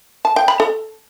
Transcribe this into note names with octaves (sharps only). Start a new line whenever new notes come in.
A5
G5
B5
A4